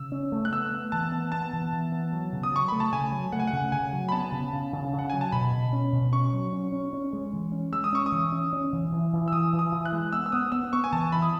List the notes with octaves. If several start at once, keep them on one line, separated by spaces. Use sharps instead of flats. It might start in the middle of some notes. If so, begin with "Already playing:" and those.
Already playing: C#3 E6
C#4
A3
F#6
B3 E6
B3
E3 A5
B3
B3 A5
E3
E3
B3
F#3
C#3
D#6
F#3 C#6
A3 B5
A5
C#3 G#5
F#3
A3 F#5
G#5
F#5
C#3
C#3 G#5
F#3
B5
B3 A5
C#3
C#3
C#3
C#3
F#5
F#3 G#5
A5
B2 B5
B2
C#4
B2
C#4 C#6
F#3
C#4
C#4
C#4
G#3
E3
C#4
G#3 E6
D#6
C#4 C#6
D#6
E3
C#4
C#4
E3
E3
E3
E6
E3 D#6
E3
D#6
E3
F#6
G#3
B3 E6
E6
B3 D#6
B3 E6
B3 C#6
G#5
E3 A5
E3 B5
D#6